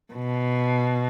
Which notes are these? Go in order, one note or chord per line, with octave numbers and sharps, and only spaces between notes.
B2